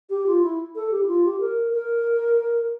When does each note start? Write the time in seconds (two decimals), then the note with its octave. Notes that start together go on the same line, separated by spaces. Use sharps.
0.10 G4
0.26 F4
0.42 E4
0.75 A4
0.91 G4
1.02 E4
1.07 F4
1.25 G4
1.40 A#4
1.73 A#4